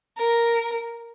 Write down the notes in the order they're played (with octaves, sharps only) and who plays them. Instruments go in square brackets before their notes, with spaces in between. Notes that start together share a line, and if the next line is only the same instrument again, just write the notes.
[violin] A#4